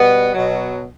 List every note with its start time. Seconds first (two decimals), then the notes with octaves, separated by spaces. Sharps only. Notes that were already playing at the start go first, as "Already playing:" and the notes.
Already playing: B2 G3 B3
0.34 B2 F#3